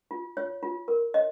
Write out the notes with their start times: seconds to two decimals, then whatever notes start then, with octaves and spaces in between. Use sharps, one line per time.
0.11 F4
0.37 F4 C#5
0.63 F4
0.88 A#4
1.14 C#5 D#5